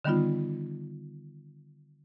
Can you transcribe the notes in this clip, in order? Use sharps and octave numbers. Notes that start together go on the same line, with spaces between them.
D3 D#3 G3 B3 D#4 F4